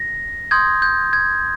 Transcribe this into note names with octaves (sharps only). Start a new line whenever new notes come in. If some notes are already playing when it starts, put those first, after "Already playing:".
Already playing: A#6
C6 D#6 G6 G#6
G6
G#6